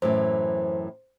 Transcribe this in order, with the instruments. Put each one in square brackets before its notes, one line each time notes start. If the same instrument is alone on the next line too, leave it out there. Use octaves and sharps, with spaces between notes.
[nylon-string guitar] F#2 A2 E3 [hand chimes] C5